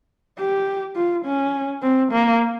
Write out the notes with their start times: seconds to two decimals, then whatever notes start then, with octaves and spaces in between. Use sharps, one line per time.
0.39 G4
0.96 F4
1.25 C#4
1.82 C4
2.12 A#3